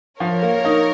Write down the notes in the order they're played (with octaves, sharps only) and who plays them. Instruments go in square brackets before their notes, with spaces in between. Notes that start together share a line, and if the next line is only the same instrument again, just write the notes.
[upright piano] F3 [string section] A#4 C#5
[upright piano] A#3
D#4